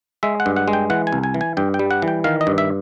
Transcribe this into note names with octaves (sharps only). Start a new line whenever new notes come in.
G#3 E5
F#5
G2
F#5
G#3
G5
E3 F#5
G#5
C2
G#5
E3
G#5
G2 G5
G5
G3
F#5
E3
G5
D#3 F5
D#5
G2
E5